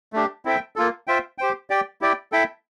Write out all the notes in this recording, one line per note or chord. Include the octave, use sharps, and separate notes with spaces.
A3 D4 G4
C4 E4 A4 E5 G5
A#3 F4 A4
F4 C5 E5 G5
G4 C5 G5
G4 D5 G5
E4 G4 D5 G5
E4 A4 E5 G5